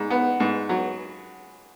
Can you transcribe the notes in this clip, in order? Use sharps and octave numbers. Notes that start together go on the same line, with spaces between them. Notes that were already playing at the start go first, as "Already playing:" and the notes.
Already playing: G#2
B3
G#2
F#3